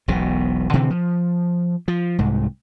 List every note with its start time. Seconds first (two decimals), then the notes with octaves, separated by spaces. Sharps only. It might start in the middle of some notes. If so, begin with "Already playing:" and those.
0.08 E1 B1 B2
0.73 B2 D3 E3 C4
0.90 F3
1.88 F3
2.19 C2 G#2